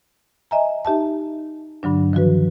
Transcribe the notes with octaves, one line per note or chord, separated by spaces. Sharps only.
D#5 E5 G#5 A#5
D#4 G4 E5 A5
G2 D3 F#3 D4
D#3 F3 F#4 B4